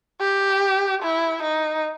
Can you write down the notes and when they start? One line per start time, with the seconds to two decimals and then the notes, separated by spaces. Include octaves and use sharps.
0.21 G4
1.03 E4
1.42 D#4